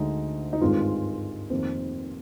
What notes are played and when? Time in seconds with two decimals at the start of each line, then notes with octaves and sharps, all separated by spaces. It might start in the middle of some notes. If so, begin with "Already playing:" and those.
Already playing: D2 D3 G#3 D#4
0.53 D#4
0.60 G#1 G2 D#3 G#3 F4
1.50 F1 F2 D#3 A#3